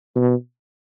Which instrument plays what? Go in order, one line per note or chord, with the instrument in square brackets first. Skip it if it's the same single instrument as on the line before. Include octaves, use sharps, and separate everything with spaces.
[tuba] B2